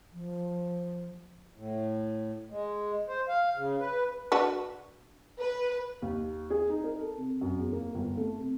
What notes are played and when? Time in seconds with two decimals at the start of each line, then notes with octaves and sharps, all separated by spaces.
0.13 F3
1.54 A2
2.50 G#3
3.08 C5
3.29 F5
3.56 C#3
3.80 B4
4.32 D4 F#4 B4
5.39 B4
6.02 D#2
6.50 G#4
6.69 D#4
6.84 A#4
7.00 A4
7.18 C3
7.41 F#2
7.59 E2
7.72 A#3
7.94 G1
8.17 A3
8.39 C3